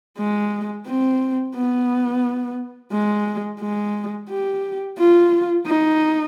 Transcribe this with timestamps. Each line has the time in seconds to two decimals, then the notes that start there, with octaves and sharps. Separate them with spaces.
0.18 G#3
0.87 C4
1.56 B3
2.92 G#3
3.60 G#3
4.29 G4
4.98 F4
5.67 D#4